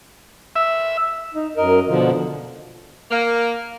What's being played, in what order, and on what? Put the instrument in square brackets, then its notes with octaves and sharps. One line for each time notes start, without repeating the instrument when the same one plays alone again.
[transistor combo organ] E5
[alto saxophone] D#4
[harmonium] F#2 A#4 [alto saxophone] D#5
[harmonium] B2 D3 F3 [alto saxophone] F4
[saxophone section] A#3